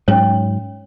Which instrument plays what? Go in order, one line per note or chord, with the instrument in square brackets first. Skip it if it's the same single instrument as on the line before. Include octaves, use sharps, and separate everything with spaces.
[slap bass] G#2 F#3 [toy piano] C#4 C#5